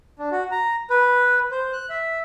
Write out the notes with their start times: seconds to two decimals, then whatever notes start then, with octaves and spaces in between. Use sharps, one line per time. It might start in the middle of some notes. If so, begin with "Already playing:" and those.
0.19 D4
0.31 F#4
0.51 A#5
0.90 B4
1.52 C5
1.73 F#6
1.90 E5